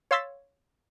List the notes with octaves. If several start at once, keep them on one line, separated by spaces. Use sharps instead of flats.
C#5 F5 C6 E6 A6 B6